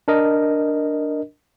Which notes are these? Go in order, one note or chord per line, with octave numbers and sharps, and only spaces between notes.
D4 A#4 D#5